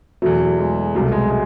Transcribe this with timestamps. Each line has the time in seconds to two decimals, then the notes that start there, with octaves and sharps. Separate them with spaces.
0.22 E2 B2 F#3 A3
0.40 A3
0.59 G#3
0.95 C2 B2 F#3
1.01 A3
1.12 G#3
1.30 G#3